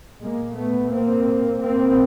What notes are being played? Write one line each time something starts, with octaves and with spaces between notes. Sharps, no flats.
A#2 G#3 A#3
A3 B3
A#3 C4
A#2 A#3 C4